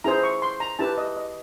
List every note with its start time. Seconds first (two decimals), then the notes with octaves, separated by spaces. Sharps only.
0.04 E4 G#4 C5 A#5
0.24 C#6
0.42 C6
0.60 A#5
0.79 E4 G4 B4 A5
0.98 D#5
1.17 D#5